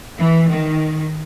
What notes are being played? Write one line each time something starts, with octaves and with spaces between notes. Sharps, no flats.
E3
D#3